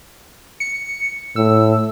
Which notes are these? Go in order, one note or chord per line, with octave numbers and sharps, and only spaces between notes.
C#7
A2 E6